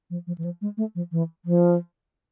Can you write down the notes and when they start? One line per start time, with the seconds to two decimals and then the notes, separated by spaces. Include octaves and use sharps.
0.10 F3
0.27 F3
0.38 E3
0.44 F3
0.61 G#3
0.77 A3
0.95 F3
1.12 E3
1.45 F3